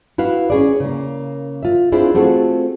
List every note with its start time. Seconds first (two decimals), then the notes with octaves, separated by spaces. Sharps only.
0.18 E4 F#4 B4 F5
0.50 C#4 G#4 D5
0.80 C#3 A#3
1.63 F4 E5
1.92 C4 D4 E4 F4 G#4
2.14 A3 C4 F4 F#4 G#4 A4